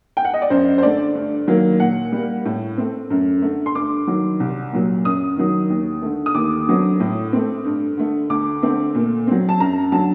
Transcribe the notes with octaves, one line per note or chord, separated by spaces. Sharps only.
G5
F#5
D#5
D5
F#2 C5
C5
D3 A3 D5
G2
D#3 F#3 A#3
A#2 F#5
G3 A#3
A2
A3 C4
F#2
D3 A3
C6
G2 D6
D#3 F#3
C2
A#2 F#3
F#2 D#6
D#3 F#3
D#2
D3 A3
D#6
D#2 D6
D3 F#3 A3 C4
A2
A3 C4
G2
D3 A3
D2 D6
D3 A3 C4
A#2
F#3 C4
A5
F#2 A#5
D3 F#3 A5